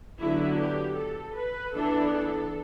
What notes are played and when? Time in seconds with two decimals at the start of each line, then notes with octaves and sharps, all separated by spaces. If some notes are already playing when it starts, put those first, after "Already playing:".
0.21 D3 F#3 B3 E4
0.60 G4
0.98 A4
1.37 B4
1.75 E3 B3 D4 A4
2.14 A4